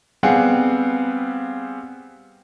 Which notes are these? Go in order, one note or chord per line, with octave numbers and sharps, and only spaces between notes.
G3 B3 C4 G#4 F5 F#5